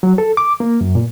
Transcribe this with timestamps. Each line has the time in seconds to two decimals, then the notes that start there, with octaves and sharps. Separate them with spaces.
0.03 F#3
0.18 A4
0.37 D6
0.60 A#3
0.81 F#2
0.95 A#2